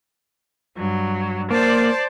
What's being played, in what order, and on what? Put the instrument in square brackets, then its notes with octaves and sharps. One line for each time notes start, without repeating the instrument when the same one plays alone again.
[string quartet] G2 F#3
[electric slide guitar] A#3 [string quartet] C5 D5 A5